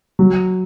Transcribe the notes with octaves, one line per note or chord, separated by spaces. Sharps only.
F#3